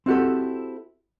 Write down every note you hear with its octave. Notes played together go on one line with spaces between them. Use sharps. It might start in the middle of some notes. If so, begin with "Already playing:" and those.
C4 E4 F#4 G4 A4